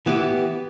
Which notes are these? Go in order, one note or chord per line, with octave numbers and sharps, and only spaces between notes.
E3 B3 E4 G4